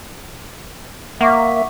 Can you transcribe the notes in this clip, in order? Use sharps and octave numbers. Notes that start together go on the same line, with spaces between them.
A#3 E5 F#5 C#6 D6